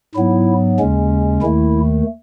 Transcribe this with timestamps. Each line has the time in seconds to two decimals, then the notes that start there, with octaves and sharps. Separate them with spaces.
0.15 G#2 F#3 B3 E4
0.79 D#2 C#3 G#3 C#4
1.42 D#2 D#3 A3 E4